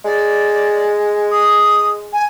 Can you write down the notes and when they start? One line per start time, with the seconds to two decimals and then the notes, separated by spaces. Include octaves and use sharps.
0.05 G#3 D5
1.30 D#6
2.12 G#5